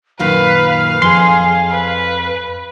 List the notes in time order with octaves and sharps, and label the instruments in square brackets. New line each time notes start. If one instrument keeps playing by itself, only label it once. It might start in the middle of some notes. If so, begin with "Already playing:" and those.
[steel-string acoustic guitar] F#2 A#2 D#3 [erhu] B4 [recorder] F5
[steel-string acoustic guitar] F2 [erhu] G#4 [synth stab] C6
[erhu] B4